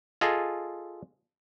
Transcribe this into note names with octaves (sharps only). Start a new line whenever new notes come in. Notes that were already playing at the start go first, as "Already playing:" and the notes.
F4 G#4 A4 D#5